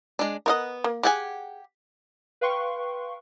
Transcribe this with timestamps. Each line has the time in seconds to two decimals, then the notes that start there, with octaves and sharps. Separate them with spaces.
0.19 G#3 D4
0.46 B3 A#4 C#5 D#5 F5 F#5
0.84 A#3
1.03 G4 G#4 F#5 G#5
2.41 B4 F5 G5 C6 C#6